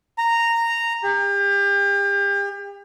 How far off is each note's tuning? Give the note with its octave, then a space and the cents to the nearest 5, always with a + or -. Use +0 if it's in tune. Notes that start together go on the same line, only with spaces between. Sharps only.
A#5 -10
G4 +35